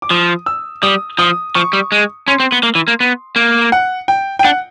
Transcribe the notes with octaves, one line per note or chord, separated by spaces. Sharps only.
D6
F3 D#6
E6
G3 D#6
F3 D#6
F3 C#6
G3
G#3
C#4 C6
C4
B3
A#3
E3
A#3
B3
A#3
F#5
G5
G5
D4 F#5